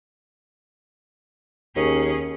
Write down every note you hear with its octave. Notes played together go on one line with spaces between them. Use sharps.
D#2 C#4 G#4